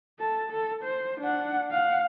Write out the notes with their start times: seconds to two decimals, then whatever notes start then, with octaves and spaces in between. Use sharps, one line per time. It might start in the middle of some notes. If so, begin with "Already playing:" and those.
0.19 A4 A5
0.49 A4
0.83 C5
1.20 D4 F#5
1.71 F5 F#5